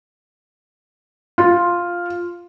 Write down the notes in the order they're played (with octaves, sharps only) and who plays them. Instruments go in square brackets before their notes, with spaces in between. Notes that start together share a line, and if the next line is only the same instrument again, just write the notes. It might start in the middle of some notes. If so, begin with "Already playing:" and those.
[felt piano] F4